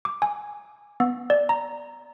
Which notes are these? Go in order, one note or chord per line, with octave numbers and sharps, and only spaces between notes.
D6
G#5
B3
D5
A#5